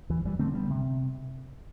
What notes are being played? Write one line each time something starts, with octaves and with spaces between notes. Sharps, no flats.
E2 E3
E3 G3
D3 A3 C4
G3 B3
C3